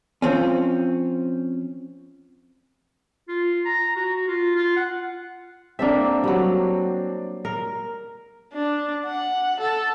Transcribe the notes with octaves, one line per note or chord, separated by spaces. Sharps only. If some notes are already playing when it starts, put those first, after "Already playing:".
F3 C4 C#4
F4
A#5
F#4
F4
F4
F#5
A#3 C4 D4 A4 E5
F#3 G3
A#4
D4
F#5
A4